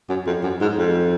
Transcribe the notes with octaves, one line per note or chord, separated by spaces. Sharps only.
F#2
F2
F#2
G#2
F2